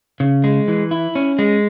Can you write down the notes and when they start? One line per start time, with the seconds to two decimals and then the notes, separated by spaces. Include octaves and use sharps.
0.20 C#3
0.44 G#3
0.68 E3
0.91 E4
1.15 C#4
1.39 G#3